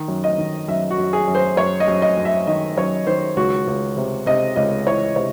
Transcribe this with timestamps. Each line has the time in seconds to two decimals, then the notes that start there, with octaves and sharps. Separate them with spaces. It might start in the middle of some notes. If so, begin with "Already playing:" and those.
Already playing: D#3
0.08 F#2
0.24 D#5
0.38 D#3
0.68 F#2 E5
0.91 F#4
0.99 F#2
1.13 G#4
1.28 F#2
1.35 C5
1.57 F#2 C#5
1.80 D#5
1.88 F#2
2.02 D#5
2.17 F#2
2.25 E5
2.47 D#3 D#5
2.77 F#2 C#5
3.07 D#3 C5
3.37 C#2 F#4
3.67 C#2
3.97 C3
4.26 C3 D#5
4.56 C#2 D#5
4.87 E3 C#5
5.16 C3 C#5